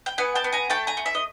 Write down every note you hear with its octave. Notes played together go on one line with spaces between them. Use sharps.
G5
B3 F#5 G#5
G5 A5
B3
G#5 A#5
A3 G5 A5
G#5 A#5
A3
E5
D#5